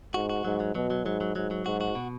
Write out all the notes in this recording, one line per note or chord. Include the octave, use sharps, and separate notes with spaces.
G#2 F#4
F#4
G#2 F#3
F#3
B2 F#3
F#3
G#2 F#3
F#3
G#2 F#3
F#3
G#2 F#4
F#4
B2